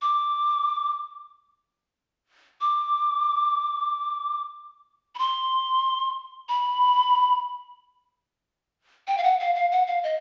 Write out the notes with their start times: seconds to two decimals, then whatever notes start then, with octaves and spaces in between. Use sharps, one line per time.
0.02 D6
2.61 D6
5.15 B5
5.19 C6
6.48 B5
9.07 G5
9.18 F5
9.24 F#5
9.40 F5
9.55 F5
9.71 F#5
9.87 F5
10.03 D#5